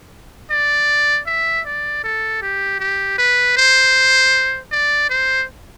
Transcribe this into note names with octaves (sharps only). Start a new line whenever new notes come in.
D5
E5
D5
A4
G4
G4
B4
C5
D5
C5